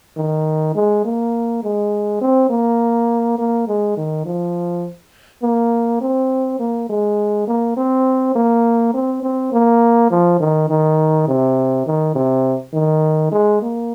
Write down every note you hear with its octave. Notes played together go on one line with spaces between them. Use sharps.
D#3
G#3
A#3
G#3
C4
A#3
A#3
G#3
D#3
F3
A#3
C4
A#3
G#3
A#3
C4
A#3
C4
C4
A#3
F3
D#3
D#3
C3
D#3
C3
D#3
G#3
A#3